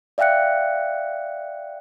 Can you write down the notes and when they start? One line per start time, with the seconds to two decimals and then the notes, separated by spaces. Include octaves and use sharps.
0.18 D5 E5 F5 G5 F#6 C#7